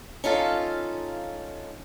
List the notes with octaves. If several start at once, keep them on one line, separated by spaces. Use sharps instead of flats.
C#4 D#4 F4 A4 F5